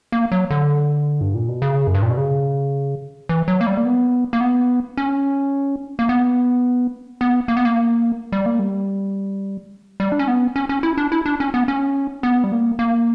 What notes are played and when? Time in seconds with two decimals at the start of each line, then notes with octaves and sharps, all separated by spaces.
0.12 A#3
0.32 F#3
0.50 D3
1.21 G2
1.34 A#2
1.48 B2
1.62 C#3
1.87 F#2
1.94 G2
2.03 A#2
2.10 B2
2.17 C#3
3.29 E3
3.48 F#3
3.61 A#3
3.67 G3
3.77 A#3
3.85 B3
4.33 A#3
4.41 B3
4.97 C#4
5.99 A#3
6.09 B3
7.21 B3
7.48 A#3
7.57 B3
7.65 A#3
8.32 G3
8.46 A#3
8.59 G3
10.00 G3
10.12 D4
10.19 C#4
10.28 B3
10.56 C#4
10.69 C#4
10.83 E4
10.98 D4
11.12 E4
11.26 D4
11.40 C#4
11.54 B3
11.68 C#4
12.23 B3
12.44 G3
12.52 A#3
12.79 A#3